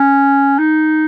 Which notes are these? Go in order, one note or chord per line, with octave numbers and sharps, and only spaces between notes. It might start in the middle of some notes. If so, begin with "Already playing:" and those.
Already playing: C#4
D#4